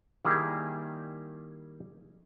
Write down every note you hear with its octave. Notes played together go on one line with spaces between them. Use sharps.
D#3 G3 A#3 E4 G#4